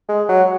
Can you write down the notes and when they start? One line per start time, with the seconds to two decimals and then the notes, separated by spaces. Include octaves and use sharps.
0.09 G#3
0.29 F#3